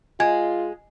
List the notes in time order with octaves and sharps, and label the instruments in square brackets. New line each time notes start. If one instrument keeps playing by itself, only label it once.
[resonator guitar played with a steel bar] G#3 [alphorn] F4 [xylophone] G#5 G#6